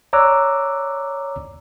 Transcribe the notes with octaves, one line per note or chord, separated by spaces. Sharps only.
C#5 D5 A#5 D6 E6 F#6